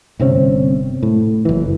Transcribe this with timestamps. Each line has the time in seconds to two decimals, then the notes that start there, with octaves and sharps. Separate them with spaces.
0.20 G1 C3 C4 C#4
1.03 A2
1.45 F#1 E3